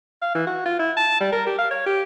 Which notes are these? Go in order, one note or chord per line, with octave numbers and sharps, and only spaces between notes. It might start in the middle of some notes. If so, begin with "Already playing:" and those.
F5
E3
F#4
F4
E4
A5
G3
A#4
G4
F5
C#5
G4